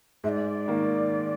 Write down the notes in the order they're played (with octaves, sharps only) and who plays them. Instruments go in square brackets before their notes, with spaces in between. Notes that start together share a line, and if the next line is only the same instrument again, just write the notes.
[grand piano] G#2 [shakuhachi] D5 E5
[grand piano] D#3 A#3